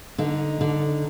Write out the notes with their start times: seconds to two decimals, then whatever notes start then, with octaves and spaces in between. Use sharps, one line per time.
0.18 D3 D#4
0.61 D3